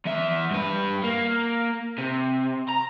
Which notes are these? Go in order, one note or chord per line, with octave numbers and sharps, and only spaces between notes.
E2 E5
G2 B4
A#3
C3
A#5